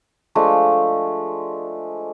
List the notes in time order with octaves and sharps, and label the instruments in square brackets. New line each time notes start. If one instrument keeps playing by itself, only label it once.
[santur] F3 G#3 A3 D4